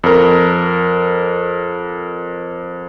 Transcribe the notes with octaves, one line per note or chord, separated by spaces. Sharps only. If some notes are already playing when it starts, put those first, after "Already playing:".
F2 A#4